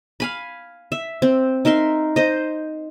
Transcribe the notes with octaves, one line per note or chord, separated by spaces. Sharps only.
F5 G#5 B5
E5
C4
D#4 A#4 E5 C6
C5 D#5